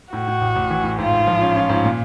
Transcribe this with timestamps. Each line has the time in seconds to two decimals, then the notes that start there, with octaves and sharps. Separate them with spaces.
0.13 A2 F#4
0.28 A2
0.41 A1
0.56 A1
0.70 E3
0.84 A2
0.98 G#2 F4
1.13 G#2
1.27 F3
1.42 C#4
1.55 C#4
1.69 G#2
1.85 A#2